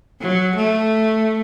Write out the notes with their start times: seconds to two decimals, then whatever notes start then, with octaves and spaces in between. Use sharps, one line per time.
0.21 F#3
0.56 A3